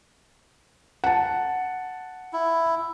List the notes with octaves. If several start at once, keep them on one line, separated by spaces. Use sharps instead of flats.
F#5 A5
E4